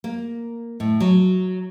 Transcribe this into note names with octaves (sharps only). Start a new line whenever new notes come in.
A#3
A2
F#3